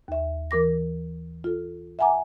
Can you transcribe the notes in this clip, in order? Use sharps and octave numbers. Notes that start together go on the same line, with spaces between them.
D#2 E5
E3 A#4 D6 A#6
F4 A4
E5 F#5 G#5 A#5 D6